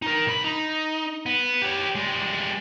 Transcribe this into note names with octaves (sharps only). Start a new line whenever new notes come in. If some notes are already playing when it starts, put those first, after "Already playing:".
D#4 A#4
B1 B5
D#4
B3
G4 C#5
G3 G#3